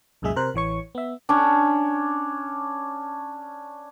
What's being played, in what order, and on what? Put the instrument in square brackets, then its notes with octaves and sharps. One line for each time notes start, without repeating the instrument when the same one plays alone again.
[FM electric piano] C2 F#2 A#2 G#3 G#4 E5
C3 A#4 C5 F#6
A1 E3 C#5 C#6
B3 E5
[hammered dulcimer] C#4 D4